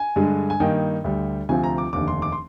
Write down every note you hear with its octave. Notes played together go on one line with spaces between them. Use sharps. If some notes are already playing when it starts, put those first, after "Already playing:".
Already playing: G#5
G2 D3 G#3
G#5
G2 D#3 A#3 D#4 G5
D2 D3 G3
D2 C3 F3 C4 F4 G#5
A#5
D6
F1 D#2 D3 D6
C6
D6
C6